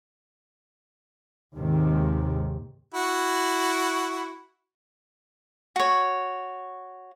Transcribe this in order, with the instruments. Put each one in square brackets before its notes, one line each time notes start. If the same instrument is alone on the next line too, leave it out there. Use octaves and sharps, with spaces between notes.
[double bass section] D#2 G#2 C3 D#3
[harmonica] E4 F#4
[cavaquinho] F#4 C#5